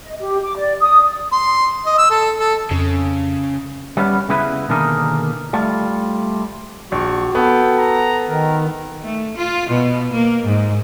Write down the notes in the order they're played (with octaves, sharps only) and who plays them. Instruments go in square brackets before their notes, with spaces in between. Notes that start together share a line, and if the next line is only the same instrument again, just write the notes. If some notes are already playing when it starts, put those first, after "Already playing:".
[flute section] D#5
G4
D6
D5
D#6
[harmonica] C6
D#5
E6
A4
A4
[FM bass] F2 [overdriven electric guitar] C#3
[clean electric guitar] G3 B3 C#4
C#3 G#3 B3 E4 B4
B2 D3 D#3 A#3 G#4 A#4
G3 A3 F4
[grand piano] A#1 [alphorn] F#4 [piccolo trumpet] C#6
[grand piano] B3 [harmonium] A4 [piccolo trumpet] G5
[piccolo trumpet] A#5
[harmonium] D#3 [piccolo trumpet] A#4
[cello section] A3
F4
B2
A#3
G#2